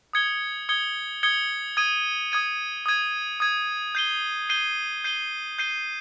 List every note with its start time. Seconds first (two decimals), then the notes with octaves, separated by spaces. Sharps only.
0.13 D#6 G#6 C#7 G7
0.69 D#6 G#6 C#7 G7
1.23 D#6 G#6 C#7 G7
1.77 D#6 G#6 D#7
2.32 D#6 G#6 D#7
2.86 D#6 G#6 D#7
3.40 D#6 G#6 D#7
3.95 G6 C7 D#7 G7
4.49 G6 C7 D#7 G7
5.04 G6 C7 D#7 G7
5.59 G6 C7 D#7 G7